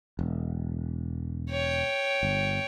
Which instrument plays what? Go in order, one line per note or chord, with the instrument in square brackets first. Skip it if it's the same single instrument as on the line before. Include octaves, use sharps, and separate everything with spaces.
[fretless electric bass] E1
[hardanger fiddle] C#5 G5
[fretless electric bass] G1